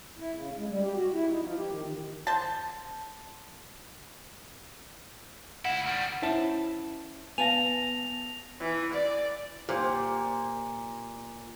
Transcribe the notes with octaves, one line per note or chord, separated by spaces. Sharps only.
E4
C#3
G#3
G3
G4
F#4
E4
D#4
F3
G4
D#3
D#3
C5 A5
C#2 E4 F#5
D#3 G3
C#4 E4 C5 A5
B3 F5 G#5 A5 A#6 F7
E3
D5
A#2 G4 C5